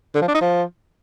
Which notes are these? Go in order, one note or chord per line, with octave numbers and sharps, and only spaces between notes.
D3
F3
D4
D#4
F3